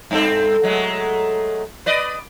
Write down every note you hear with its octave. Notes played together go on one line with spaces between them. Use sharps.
G2 C4 A4
F#3 G#3 A3
B4 D5 D#5